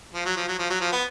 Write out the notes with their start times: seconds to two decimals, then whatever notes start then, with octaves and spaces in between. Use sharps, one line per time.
0.14 F3
0.25 F#3
0.36 F3
0.48 F#3
0.59 F3
0.70 F#3
0.81 F3
0.92 B3